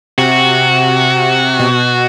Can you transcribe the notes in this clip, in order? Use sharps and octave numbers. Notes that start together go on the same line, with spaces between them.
C3 F#4
B2